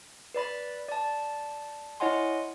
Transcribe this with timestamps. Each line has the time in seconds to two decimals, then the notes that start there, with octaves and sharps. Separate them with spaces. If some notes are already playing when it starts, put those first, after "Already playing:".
0.34 B4 D5 B5 A6
0.88 D5 A5
2.00 E4 C#5 D#5 F#5 G#5 C6